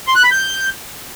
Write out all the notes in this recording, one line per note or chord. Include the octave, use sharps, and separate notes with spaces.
C6
F#6
B5
G6